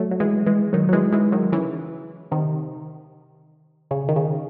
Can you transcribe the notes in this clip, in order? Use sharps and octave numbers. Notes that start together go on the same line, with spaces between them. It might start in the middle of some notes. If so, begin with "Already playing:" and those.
Already playing: F#3 A3
F#3
E3 G#3
E3 G#3
D#3 F#3
F#3
E3 G#3
E3 G#3
D#3 F#3
C#3 E3
C3 D#3
C#3
D#3
C#3